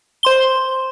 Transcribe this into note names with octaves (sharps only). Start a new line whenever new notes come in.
C5 C6 G7